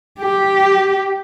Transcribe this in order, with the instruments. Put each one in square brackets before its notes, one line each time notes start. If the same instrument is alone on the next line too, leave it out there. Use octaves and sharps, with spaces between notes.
[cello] G4